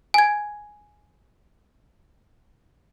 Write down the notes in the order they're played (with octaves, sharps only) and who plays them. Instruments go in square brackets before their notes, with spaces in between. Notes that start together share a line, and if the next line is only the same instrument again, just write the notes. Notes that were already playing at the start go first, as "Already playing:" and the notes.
[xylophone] G#5 G#6